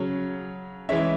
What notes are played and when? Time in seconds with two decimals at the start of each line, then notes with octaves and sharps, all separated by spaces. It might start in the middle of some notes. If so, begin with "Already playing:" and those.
Already playing: C#3 F#3 C#4
0.89 E3 G#3 C#4 E5